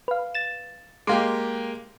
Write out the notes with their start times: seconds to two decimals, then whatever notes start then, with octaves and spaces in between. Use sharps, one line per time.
0.08 B4 F5
0.35 A6 E7
1.07 G#3 A#3 G4 F5 C6 D6